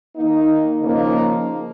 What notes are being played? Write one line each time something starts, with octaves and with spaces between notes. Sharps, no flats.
D#3 A#3 D#4
C#3 F3 A#3 D#4